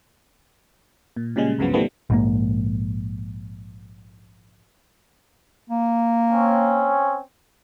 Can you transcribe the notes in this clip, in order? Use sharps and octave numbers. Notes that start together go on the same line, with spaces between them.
A#2
A#2 C#3 G3 G#3
C#2 G2 C#3 F3 F#3 B3
B2 D#3 F3 G3 A3 B3
A#1 G#2 A#3
A#3
C4 C#4